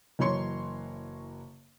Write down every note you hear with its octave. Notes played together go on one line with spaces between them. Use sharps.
F#1 E3 F#3 C#5 C6 C#7